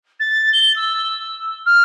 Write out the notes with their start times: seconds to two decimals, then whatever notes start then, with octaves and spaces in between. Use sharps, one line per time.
0.19 A6
0.53 G7
0.76 E6
1.66 F6